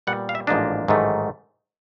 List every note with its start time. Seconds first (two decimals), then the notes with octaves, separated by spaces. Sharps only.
0.07 A#2 G3 B3 F#5
0.29 F5
0.35 E5
0.47 A1 G#2 F3 A#3 D4 D#5
0.88 A1 G#2 D#3 F#3 A3